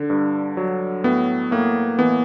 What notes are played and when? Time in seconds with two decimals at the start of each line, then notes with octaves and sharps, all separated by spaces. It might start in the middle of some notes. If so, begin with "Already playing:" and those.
Already playing: D3
0.10 G2
0.57 F#3
1.04 A2 B3
1.51 A2 A#3
1.99 E3 B3